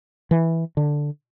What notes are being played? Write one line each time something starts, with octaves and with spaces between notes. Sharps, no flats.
E3
D3